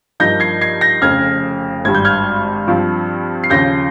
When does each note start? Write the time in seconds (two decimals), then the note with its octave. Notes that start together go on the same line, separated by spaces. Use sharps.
0.20 G2 F3 A#3 D#4 G6 A#6
0.40 G#6 C7
0.61 G#6 C7
0.81 G6 A#6
1.02 F1 F2 C#3 F6 G#6
1.85 G#1 G2 G3 G#6
1.95 G6
2.05 F6 G#6
2.68 G2 F3 C4 F4
3.44 C7
3.50 D#2 C#3 F3 G6 A#6